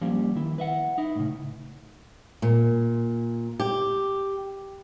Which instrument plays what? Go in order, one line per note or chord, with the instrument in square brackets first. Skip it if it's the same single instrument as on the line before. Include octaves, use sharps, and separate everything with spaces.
[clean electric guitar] F3 G3 A#3 C#4
D#3 E4
B4 E5 F#5
D#4 E4
A2 C#3
[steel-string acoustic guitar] A#2
G4